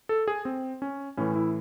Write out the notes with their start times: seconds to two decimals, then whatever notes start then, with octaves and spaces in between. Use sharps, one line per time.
0.09 A4
0.28 G#4
0.45 C4
0.82 C#4
1.17 A2 E3 C#4
1.36 E4